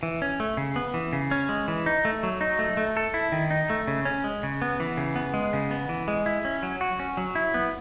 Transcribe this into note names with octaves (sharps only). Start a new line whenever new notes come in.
E3
C#4
A3
C#3
B3
E3
C#3
C#4
G#3
E3
D#4
A3
F#3
D#4
A3
A3
A4
E4
D#3
D#4
A3
C#3
C#4
G#3
C#3
B3
E3
C#3
B3
G#3
C#3
B3
E3
G#3
E4
C#4
F#3
F#4
C#4
F#3
E4
B3